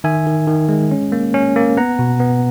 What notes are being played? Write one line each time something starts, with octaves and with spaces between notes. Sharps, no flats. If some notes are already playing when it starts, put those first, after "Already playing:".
D#3 E5 G#5
D#3
D#3
G#3
C#4
A#3
C#4
A#3
B3 F#5 A#5
B2
B3